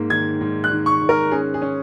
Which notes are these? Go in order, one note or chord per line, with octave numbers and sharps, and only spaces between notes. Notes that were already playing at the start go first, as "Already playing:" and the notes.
Already playing: G#2 A#3
D#3 G#6
G#2
F#6
D#3
C#6
G#2
A#4
C#4 G#4
G#4
C#4